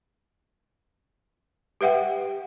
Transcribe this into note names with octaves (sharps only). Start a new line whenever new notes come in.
G4 B4 E5 F#5 G5